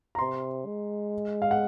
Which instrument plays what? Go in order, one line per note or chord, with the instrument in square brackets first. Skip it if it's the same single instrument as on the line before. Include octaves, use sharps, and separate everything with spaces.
[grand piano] A#5
[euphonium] C3 [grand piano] C6
[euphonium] G#3
[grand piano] F5
F#5